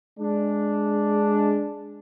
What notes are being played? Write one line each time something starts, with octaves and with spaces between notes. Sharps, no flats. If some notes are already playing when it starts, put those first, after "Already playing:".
G#3 D4